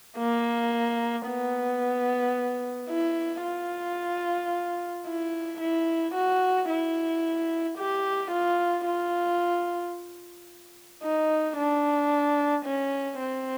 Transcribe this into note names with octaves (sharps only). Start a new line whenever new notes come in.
A#3
B3
E4
F4
E4
E4
F#4
E4
G4
F4
F4
D#4
D4
C#4
C4